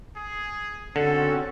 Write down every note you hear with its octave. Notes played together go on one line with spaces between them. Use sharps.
G#4
D3 C4 C#4 F#4 A4